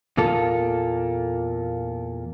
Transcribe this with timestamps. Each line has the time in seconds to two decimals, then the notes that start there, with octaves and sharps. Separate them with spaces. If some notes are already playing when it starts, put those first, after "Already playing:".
0.17 E2 A#2 A#3 F4 A4